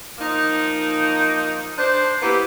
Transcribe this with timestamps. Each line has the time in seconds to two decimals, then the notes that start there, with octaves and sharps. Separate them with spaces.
0.18 F3 A#3 D#4
1.78 D4 C5
2.22 A#3 B3 E4 G4